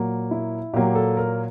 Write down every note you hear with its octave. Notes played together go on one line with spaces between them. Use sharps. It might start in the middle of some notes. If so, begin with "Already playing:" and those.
Already playing: A#2 F#3 A#3
E4
A#2 F#3 A#3 G4
A4
A#4